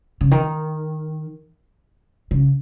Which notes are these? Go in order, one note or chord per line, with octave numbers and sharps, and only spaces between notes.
C#3
D#3
C#3